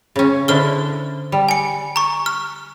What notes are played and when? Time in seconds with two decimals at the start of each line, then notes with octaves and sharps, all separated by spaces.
0.16 C#3 C#4
0.48 D3 D4 E4 C5 F6 G7
1.32 G3
1.49 G#5 C#7
1.96 A#5 C#6
2.26 F6